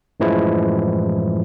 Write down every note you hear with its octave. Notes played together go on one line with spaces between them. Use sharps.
F#2 A2 E3 F3 G#3 E4